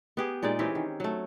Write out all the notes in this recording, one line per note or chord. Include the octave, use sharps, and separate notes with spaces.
B3 G4 G#4
A#2 G#3 D#4 D5
E3 C4 C#4 G4
D#3
F#3 A3